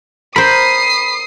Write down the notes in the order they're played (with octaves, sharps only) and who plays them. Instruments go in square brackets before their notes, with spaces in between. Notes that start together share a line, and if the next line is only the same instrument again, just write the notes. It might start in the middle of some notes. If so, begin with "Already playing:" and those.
[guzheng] A#4 C5 [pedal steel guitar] B5 [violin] D#6 C7